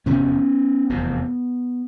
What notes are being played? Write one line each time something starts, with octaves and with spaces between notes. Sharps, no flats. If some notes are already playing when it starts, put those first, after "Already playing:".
F1 E2 C3 B3 C#4
F1 E2 C3